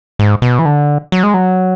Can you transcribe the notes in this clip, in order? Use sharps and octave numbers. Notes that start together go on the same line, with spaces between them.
G#2
B2
E3
D3
F#3
G#3
F#3